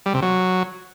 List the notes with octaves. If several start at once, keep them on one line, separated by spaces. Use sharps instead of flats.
G3
C3
F#3